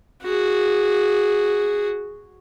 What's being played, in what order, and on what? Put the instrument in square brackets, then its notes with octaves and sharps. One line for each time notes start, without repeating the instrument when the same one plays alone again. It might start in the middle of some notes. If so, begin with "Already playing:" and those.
[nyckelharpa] F#4 G#4